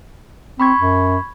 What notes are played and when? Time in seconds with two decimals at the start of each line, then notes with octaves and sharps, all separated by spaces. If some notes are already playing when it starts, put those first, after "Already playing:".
0.60 C4 B5 C#6 G#6
0.79 F#2